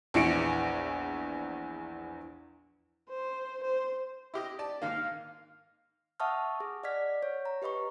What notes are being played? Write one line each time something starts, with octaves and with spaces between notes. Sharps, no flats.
A#1 E2 E3 E4 C#7 D7
C5
C5
E4 G4 D#5
D5 A5
G#2 D#3 A#3 F5
E5 F#5 A5 C#6 D#6 F6
G#4
D5 D#5 F#5 F6 G#6 B6
C#5
A#5
G4 B4 D#5 B5 C#6